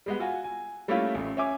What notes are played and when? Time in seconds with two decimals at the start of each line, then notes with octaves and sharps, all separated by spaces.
0.06 G3 G#3 B3
0.20 F4 F#4 G#5
0.44 G#5
0.88 G3 A3 A#3 C#4 E4 F4
1.15 A1 A3
1.37 C#4 E5 G#5 D6